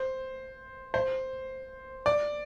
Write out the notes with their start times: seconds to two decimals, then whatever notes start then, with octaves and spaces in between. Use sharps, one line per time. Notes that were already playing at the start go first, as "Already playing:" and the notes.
Already playing: C5
0.94 C5
2.06 D5